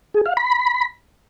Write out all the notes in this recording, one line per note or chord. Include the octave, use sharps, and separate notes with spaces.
G#4
F5
B5